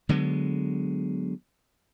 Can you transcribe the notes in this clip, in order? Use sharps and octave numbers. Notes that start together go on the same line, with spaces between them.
D3 F#3 G#3 B3